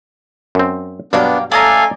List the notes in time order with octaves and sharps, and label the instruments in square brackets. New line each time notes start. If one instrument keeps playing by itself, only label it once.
[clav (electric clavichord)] F#2 C4
[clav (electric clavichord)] G2 B2 F#3 [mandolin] A#3 F5 G5 [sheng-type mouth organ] B3 D4
[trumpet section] A3 C#4 G#5 [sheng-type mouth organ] A4 F5 [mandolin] D5 D#5 A#5